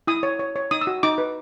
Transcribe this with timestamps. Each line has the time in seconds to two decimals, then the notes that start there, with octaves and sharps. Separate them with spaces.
0.07 E4 D#6
0.23 C#5
0.39 C#5
0.56 C#5
0.71 D#4 D#6
0.81 E6
0.87 F#4
1.03 D#4 D6
1.18 B4